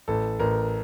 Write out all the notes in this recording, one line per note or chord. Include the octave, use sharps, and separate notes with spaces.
A1 A4
A1 A#4